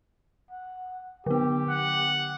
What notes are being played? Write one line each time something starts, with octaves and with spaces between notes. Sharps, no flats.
F#5
D3 B3 G4
F#5